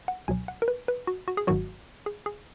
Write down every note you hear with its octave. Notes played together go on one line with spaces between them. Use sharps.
F#5
C#2 B2 F#3 G#5
F#5
A#4
B4
B4
F#4
F#4
G#4
G#1 G#2 D#3 F#3 F#4
G#4
G#4